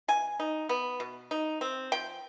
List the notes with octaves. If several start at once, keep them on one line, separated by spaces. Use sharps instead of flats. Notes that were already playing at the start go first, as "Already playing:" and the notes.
B2 G#5
D#4
B3
B2
D#4
C4
F3 G5